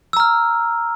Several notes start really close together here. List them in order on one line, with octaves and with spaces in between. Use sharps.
E6 A#5 F6